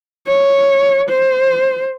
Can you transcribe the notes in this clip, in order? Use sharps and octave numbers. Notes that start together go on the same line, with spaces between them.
C#5
C5